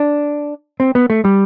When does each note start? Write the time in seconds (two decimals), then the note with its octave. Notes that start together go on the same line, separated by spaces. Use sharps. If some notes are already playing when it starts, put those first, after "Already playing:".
Already playing: D4
0.80 C4
0.95 B3
1.10 A3
1.25 G3